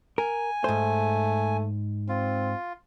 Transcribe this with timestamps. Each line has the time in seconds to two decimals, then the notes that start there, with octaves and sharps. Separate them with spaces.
0.18 A#4 G#5
0.64 G#2 A3 C5
2.09 C4 F4